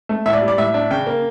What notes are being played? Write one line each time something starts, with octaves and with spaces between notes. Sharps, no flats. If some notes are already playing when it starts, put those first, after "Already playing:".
A3
A2 E5
D5
G3
D5
A2 E5
D4
C#3 G5
A#3